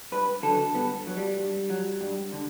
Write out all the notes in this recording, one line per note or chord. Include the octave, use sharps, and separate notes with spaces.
G2 B4
D3 F#3 A4
G2 B3
F#3
G3
G2
F#3
G2
D3